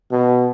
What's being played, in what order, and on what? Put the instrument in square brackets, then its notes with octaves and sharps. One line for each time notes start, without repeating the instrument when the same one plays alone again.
[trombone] B2